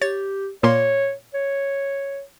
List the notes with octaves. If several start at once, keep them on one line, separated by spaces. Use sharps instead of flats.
G4 C#5 A6
A#2 A#3 C#5 C6
C#5